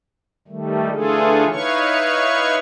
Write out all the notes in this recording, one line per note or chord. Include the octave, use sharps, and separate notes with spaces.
D#3 G3 A3
D3 E3 A3 F4 G#4 A4
D#4 E4 B4 C#5 F5 C#6